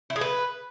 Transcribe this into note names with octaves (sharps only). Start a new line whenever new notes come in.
E4
G#4
B4